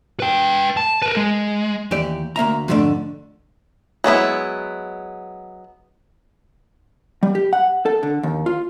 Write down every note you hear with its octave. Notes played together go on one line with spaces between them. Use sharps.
B4 G5
A5
A#4 B4
G#3
D#2 E3 G4 D5
D2 A#3 E5 A#5
F2 G#2 D3 A3 D4
F#3 G#3 B3 E4
G3
G4
F#5
A4
D3
D#2
F4